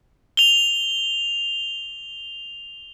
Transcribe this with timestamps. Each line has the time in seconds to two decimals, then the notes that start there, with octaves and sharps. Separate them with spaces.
0.37 F7 G7